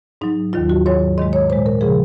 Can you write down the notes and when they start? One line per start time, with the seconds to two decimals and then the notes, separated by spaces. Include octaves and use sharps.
0.21 G#2 F#3 D#4
0.53 D#2 D#3 F#3 F4
0.70 F#4
0.86 G#2 D#3 F#3 C#5
1.17 G#2 D#3 G#3 D#5
1.33 C#5
1.50 A#2 G#3 C5
1.66 A#4
1.81 C#3 F3 G#3 G#4